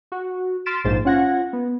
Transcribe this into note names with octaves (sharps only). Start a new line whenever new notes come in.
F#4
C6 F6 A6 B6 D7 E7
A#1 G#2 C5 A6 E7
C#4 F4 F#5 G#6 A#6
B3